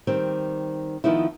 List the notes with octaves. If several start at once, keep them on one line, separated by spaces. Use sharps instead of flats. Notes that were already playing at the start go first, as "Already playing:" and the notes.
D#3 G3 C4
D#3 F3 B3 D#4 E4